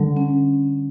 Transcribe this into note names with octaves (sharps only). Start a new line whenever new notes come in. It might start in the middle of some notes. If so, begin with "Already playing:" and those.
Already playing: D3 G3
C#4